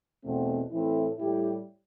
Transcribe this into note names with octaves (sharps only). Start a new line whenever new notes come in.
E2 B2 A3 C4
A2 E3 A3 C4 E4
A2 G3 E4 G4